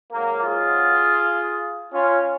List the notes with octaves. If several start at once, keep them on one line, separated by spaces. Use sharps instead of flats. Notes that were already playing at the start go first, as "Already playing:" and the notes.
G#2 F#3 A#3
F4 G#4
C#4 F4